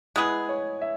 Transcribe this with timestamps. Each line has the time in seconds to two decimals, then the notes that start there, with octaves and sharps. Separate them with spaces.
0.16 G#3 B3 E4 G#4 B4
0.49 C#5
0.81 E5